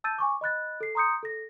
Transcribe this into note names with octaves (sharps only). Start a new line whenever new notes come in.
A5 E6 G6 A6 D#7
G#5 C#6 D6
D#5 B5 F#6 A6
A4 C7
A#5 C6 D#6 G6 C#7
A4 A#6